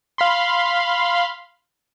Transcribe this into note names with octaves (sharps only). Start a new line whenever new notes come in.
F5 B5 C6